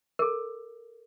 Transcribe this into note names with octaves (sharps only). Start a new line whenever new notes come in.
A4 A#4